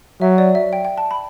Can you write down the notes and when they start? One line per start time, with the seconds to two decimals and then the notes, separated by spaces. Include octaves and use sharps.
0.21 F#3 E5
0.38 D5
0.55 E5
0.73 G5
0.85 G5
0.97 A5
1.11 B5